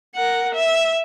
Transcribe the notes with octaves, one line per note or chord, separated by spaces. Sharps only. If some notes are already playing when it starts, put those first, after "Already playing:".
A#4 F#5
E5